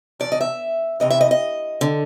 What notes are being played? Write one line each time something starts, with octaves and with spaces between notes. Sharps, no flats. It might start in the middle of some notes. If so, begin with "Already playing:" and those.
E2 B2 D5
D#5
E5
D2 C3 E3 D#5
E5
D#5
D#5
D3